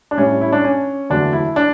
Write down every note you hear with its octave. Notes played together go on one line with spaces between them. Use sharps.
D4
A2 G3 C#4
E4
D4
C#4
E2 D3 F#3 A3 D4
E4
D4